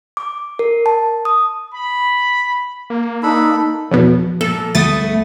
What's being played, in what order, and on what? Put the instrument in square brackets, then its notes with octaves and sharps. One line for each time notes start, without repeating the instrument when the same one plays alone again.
[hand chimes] D6
A#4
A5
D#6
[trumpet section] B5
[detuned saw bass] A#3
[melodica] D4 A4 B5 [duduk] D#4
[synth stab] B1 E2 B2 [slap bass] F3
[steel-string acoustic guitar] A#2 [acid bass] A4
[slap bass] D2 D3 G3 [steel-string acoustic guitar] A3 B3 [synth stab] D#6 A6